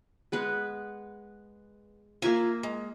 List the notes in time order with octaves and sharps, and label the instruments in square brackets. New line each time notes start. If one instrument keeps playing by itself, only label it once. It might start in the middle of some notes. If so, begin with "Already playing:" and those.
[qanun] G#3 B3 B4
[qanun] A#3 E5 G#5 [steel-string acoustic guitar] F4 A#5
[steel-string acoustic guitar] G#3